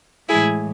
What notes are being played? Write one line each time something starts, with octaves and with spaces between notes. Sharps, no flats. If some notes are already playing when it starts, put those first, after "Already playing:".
A2 E3 G#3 E4 G#4